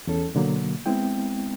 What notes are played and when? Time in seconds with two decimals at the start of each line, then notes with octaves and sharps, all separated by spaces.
0.07 E2 C#4 A4
0.35 B2 D3 F#3 A#3
0.86 G#3 B3 C4 E4 G5